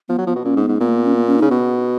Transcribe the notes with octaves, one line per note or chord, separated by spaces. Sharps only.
F3 B3
F#3
F3 B3
B2
A#2 C#4
G#2
B3
G#2
A#2 B3
A#3
B3
C#4
B3
C#4
C#3 D#4
B2 B3